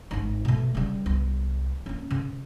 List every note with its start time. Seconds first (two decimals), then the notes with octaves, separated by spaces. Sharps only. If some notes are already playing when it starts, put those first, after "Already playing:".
0.11 G#1 D#4
0.45 B2 A3
0.74 C#3 G3
1.06 C2 B3
1.86 A#3 C#4
2.10 C#3